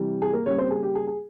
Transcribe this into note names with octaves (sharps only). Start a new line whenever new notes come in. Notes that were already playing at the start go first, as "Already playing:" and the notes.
Already playing: C3 E3 G3
G#4
A#3 A#4
C#3 G3 A#3 C#4 C#5
C4 C5
G#4
G4
G#4
G#4